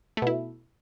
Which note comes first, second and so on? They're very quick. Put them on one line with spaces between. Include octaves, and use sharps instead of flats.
A3 B2 E4